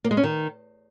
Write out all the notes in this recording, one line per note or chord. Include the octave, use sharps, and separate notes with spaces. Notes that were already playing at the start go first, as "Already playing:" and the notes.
A#3
G#3
C#4
D#3